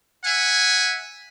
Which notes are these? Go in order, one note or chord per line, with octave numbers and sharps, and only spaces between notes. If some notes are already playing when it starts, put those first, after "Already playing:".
E5 F#5 G#5